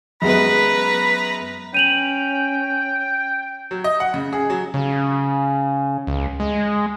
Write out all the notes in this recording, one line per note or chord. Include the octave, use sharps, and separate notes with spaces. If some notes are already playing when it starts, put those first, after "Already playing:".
F#2 G#3 B3 B4 A#5 B5
C#4 G5 D#7 F7 F#7
F#3
D#5
F#5
C#3
G#4
F#3
C#3
C#2
G#3